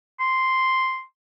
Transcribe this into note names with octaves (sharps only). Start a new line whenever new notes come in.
C6